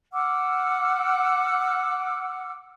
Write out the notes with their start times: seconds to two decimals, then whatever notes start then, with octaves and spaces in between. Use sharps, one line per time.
0.12 F#5 D6 E6 F6